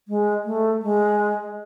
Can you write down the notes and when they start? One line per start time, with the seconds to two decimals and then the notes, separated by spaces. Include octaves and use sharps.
0.08 G#3
0.45 A3
0.82 G#3